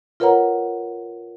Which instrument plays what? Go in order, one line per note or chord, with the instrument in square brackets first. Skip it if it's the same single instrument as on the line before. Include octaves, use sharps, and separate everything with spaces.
[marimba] F4 A#4 B4 C#5 F#5 A#5